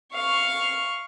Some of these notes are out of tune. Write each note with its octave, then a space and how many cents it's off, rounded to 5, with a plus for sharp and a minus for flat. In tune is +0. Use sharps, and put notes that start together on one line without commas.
F5 +0 C#6 +0